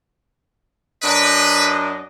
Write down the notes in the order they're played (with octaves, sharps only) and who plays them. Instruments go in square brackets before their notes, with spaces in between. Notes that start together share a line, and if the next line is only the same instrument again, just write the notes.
[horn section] F#2 D4 D#5 [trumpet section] B4